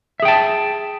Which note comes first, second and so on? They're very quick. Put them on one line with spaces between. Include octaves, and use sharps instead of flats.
E5 G#4 G5 A5